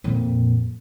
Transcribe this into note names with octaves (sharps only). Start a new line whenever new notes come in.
F2 A#2